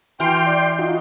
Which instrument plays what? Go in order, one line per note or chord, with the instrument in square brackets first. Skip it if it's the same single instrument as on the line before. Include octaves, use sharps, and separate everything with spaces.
[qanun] E3 [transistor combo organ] F#4 F6 [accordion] G5 C6
[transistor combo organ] D5
D#4 F4 F#4